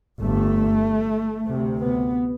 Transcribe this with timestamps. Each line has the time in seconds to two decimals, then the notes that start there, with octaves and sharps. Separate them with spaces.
0.20 G1 G2 A3
1.48 D2 C3
1.80 B3